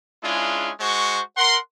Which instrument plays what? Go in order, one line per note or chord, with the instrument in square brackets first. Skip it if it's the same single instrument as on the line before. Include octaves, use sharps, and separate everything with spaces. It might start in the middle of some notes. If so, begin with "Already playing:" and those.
[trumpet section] G#3 C#4 D4 E4 F4 G#4
G#3 F#4 C5 C#6
A#4 F#5 C6